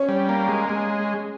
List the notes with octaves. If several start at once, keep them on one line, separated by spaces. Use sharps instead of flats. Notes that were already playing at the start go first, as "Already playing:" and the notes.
Already playing: C#4 C#5
G3
A#3
G#3
G#3